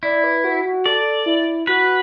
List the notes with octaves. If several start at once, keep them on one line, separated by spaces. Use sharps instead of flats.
E4 D5
B4
F#4
F#4
A4 D5
E4
F#4 B4